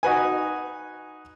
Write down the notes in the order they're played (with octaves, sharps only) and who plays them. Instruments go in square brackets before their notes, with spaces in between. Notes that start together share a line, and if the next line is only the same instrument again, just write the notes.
[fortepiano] D#4 F#4 B4 G#5